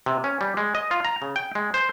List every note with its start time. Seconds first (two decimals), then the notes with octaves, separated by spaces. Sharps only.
0.06 C3
0.24 C#4
0.41 G3
0.57 G#3
0.75 D#5
0.91 F4
1.05 A#5
1.22 C#3
1.36 G5
1.55 G#3
1.74 C5